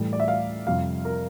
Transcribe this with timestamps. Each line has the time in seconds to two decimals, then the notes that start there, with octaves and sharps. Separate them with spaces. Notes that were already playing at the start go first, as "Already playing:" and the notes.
Already playing: A2 E3 G3
0.13 D5
0.20 E5
0.28 F5
0.67 F2 C3 G3 F5
1.05 A#4